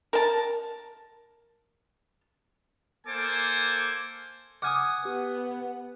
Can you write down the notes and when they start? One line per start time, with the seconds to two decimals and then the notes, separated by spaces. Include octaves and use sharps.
0.13 A#4 A5
3.07 A#3 A4 C5 G#5 D6
4.62 F#5 G#5 D6 D#6 F6
5.05 B3 G4